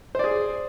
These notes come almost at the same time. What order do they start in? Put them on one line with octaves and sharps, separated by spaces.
C5 D5 G#4